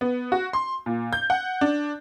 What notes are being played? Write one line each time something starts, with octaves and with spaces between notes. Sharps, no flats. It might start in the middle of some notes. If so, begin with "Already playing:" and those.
B3
F#4
C6
A#2
G6
F#5
D4